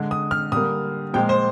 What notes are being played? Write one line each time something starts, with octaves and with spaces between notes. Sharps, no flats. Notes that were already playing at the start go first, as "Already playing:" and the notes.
Already playing: D3 G#3
D#6
F6
D3 G3 A#3 D#6
A#2 F3 G#3 G5
C5